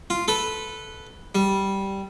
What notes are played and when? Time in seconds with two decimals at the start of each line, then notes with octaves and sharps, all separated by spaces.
0.10 F4
0.28 A4 B4
1.35 G3